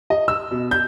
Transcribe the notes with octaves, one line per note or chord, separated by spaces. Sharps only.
D#5
E6
B2
G6